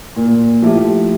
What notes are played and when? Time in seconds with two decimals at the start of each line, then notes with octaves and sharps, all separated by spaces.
0.16 A#2
0.62 F3 A3 E4 G4